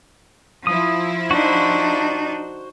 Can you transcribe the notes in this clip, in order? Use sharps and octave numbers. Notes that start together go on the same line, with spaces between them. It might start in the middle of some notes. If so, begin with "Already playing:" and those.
F3 E4 D#6
D4 D#4 F#4 C5